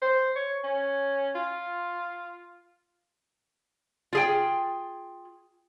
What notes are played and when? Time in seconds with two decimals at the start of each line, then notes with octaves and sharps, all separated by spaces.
0.02 C5
0.36 C#5
0.64 C#4
1.35 F4
4.13 F4 G#4 G5